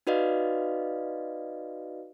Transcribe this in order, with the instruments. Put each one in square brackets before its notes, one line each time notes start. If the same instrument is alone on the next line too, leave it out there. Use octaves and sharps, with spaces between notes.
[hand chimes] D#4 F#4 B4 D5 D#5 F5